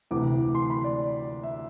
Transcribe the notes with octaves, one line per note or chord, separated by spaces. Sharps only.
D2 C3 E3 D6
C6
B5
D5
E5